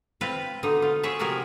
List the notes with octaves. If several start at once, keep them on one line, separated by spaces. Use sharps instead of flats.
C4 F4 B4
B2 D3 D#4 D#5
F4
G#4 C#5 E5
C3 F3 F#4 G#4 A#4